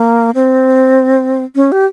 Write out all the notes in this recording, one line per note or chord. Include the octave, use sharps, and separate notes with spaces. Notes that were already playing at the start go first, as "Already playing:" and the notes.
Already playing: A#3
C4
C#4
G4